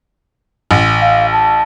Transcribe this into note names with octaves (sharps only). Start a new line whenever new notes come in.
A1
F5
A5